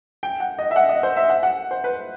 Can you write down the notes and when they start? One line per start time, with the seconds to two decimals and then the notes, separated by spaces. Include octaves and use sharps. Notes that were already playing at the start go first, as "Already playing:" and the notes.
0.23 G5
0.40 F#5
0.59 D#5
0.71 E5
0.76 F#5
0.89 D#5
1.03 C5
1.17 E5
1.30 F#5
1.43 F#5
1.71 C5
1.84 B4